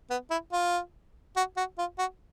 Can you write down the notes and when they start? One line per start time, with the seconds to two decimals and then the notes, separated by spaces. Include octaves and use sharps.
0.10 B3
0.30 E4
0.52 F4
1.36 F#4
1.57 F#4
1.78 F4
1.98 F#4